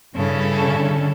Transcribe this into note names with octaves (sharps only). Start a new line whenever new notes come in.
G2 C#3 G3 C#4 E4 A4
D3